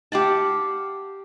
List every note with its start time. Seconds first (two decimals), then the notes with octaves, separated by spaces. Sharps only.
0.12 G4 F5 F#5 A5